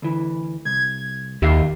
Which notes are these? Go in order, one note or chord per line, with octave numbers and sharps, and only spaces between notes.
D2 E3
C2 G#6
D#2 D#3 G4 E5 F5